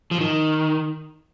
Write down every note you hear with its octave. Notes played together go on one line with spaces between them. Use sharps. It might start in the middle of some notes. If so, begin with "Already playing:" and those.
F3
D#3